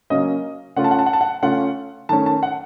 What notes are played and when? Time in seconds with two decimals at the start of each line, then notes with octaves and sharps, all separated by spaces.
0.10 C#3 F#3 A#3 C#4 D#5
0.76 C#3 A3 C#4 F4 F#5
0.84 A5
0.91 F#5
0.99 A5
1.06 F#5
1.13 A5
1.21 F#5
1.42 C#3 A3 C#4 F4 F#5
2.09 D#3 A3 C#4 A5
2.26 A5
2.43 F#5